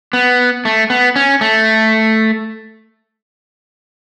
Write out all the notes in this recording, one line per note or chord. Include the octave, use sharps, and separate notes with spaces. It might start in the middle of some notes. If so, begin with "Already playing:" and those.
B3
A3
B3
C#4
A3